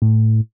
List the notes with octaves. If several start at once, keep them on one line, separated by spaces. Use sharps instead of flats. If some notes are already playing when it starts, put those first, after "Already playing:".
A2